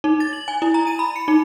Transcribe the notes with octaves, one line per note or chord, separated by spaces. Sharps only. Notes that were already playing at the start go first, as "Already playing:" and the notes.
D#4
A6
F#7
G#5
E4
A#5
D#7
B5
C#7
D#4